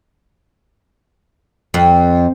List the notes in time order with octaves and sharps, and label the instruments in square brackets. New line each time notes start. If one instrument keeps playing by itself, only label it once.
[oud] F2